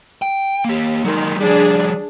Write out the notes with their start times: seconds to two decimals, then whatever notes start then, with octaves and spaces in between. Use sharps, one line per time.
0.22 G5
0.65 A#3 G4
1.04 D#3 F#3 G#3
1.40 F3 G3 D4 G#4